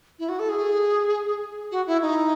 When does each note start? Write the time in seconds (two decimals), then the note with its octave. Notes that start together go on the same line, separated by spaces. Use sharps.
0.19 E4
0.28 F#4
0.39 A4
0.49 G#4
1.71 F#4
1.86 E4
2.01 D#4